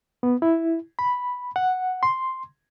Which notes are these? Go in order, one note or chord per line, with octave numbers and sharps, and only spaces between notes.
B3
E4
B5
F#5
C6